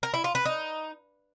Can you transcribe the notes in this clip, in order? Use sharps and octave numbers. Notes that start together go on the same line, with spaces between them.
A#4
E4
F4
B4
D#4